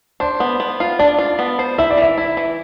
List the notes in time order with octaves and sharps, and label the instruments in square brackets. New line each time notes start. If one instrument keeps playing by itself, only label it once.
[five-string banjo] D4 [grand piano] C5
[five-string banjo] B3
B3
F4
[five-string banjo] D4 [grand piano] D5
[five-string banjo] F4
B3
C5
[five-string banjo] E4 [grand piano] E5
[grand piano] D5
[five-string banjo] E3 [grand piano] E5
[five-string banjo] E4
E3